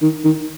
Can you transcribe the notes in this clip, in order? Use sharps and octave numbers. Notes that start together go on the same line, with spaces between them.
D#3
D#3